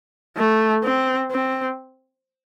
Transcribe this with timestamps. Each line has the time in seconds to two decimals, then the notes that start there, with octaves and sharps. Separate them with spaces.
0.37 A3
0.84 C4
1.31 C4